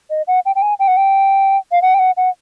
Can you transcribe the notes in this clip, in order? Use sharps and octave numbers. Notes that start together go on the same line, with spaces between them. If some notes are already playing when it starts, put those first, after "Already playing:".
D#5
F#5
G5
G5
G#5
G5
F#5
G5
F5
F#5
G5
F#5
F#5